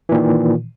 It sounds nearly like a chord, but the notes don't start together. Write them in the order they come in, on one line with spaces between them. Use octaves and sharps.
E3 A#2 D#3